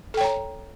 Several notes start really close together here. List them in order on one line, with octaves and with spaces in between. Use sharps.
A4 G5 C#5 A#5